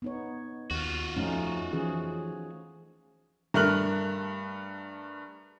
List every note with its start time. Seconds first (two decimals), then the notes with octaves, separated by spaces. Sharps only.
0.02 B3 D#4 C#5
0.71 D#2 F4 F#4
1.17 F2 A3 C#4 D#4
1.73 E3 F3 C#4 G#4
3.54 G2 A3 A#4 F6 F#6 F#7